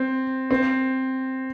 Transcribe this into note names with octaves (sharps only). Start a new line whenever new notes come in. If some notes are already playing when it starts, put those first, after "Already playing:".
Already playing: C4
C4